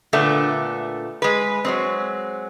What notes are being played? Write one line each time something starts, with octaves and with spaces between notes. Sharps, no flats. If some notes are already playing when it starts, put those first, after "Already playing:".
A#2 D3 A3 B3
G#3 B4
F#3 G#3 C4